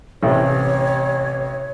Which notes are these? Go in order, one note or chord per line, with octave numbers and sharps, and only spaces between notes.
A1 C3 C#5